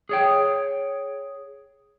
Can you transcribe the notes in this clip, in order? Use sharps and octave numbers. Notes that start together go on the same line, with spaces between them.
G#4 C#5 G5